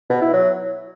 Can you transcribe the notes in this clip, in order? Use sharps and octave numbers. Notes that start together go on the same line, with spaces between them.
B2
E4
F#3